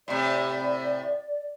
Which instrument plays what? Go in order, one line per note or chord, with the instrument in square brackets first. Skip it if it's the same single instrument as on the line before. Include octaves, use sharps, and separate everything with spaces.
[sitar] A2 C3 [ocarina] D5